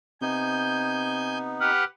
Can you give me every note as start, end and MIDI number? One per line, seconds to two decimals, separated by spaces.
0.22 1.84 48
0.22 1.71 59
0.22 1.71 63
0.22 1.38 80
0.22 1.38 91
1.60 1.84 67
1.60 1.84 71
1.60 1.84 78
1.60 1.83 89